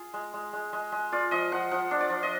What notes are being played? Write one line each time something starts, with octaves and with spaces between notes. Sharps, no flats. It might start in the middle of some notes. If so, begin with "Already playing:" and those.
Already playing: F4 G#4
G#3
G#3
G#3
G#3
G#3
F4 D5
F3 D#5
F3 F#5
F3 F#5
D4
D5
F3
D#5